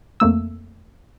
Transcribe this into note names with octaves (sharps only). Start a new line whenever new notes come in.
F2 A3 A#3 E6